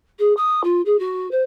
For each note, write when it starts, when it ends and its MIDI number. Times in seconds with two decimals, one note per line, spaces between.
0.19 0.33 68
0.37 0.61 87
0.64 0.81 65
0.85 0.98 68
0.99 1.29 66
1.31 1.42 72